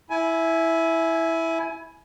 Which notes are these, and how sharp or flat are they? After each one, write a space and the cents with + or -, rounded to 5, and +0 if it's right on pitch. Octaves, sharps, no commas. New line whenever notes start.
E4 -5 G#5 +20